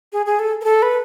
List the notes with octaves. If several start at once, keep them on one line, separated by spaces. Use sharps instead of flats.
G#4
G#4
A4
A#4
A4
B4